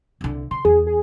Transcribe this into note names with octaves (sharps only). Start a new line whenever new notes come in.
C2 D3
C#3 C6
E2 G#4
G#4